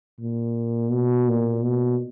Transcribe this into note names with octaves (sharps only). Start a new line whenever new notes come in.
A#2
B2
A#2
B2